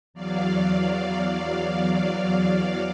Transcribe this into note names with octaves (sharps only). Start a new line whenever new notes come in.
E2 F#3 D5 F5